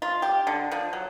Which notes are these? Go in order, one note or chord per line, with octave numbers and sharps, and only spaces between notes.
F4
G4
D3
F3
F#3